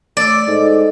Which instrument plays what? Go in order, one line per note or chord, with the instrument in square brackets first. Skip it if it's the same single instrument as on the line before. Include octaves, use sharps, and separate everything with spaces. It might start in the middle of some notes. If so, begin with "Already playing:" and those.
[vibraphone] A3 D6 E6 [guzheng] D5
[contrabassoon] G#2 [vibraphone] A4 D#5